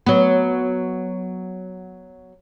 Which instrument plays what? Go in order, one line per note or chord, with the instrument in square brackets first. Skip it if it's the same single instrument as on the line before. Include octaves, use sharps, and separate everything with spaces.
[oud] F#3 B3